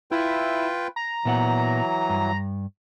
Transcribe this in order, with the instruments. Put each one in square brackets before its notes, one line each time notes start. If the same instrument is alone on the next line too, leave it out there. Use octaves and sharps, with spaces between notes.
[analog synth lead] E4 [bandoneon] F4 B4 G5
[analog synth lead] A#5
[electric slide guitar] A#2 B3 F#5 [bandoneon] E3 F#3
[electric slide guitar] G2